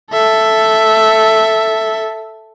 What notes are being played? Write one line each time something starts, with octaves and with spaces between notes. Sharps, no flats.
A4 E5